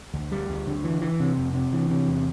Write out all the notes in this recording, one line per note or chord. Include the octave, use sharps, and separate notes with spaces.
D2
G3
D2
D3
E3
E3
C3
F1
C3
E3
C3
E2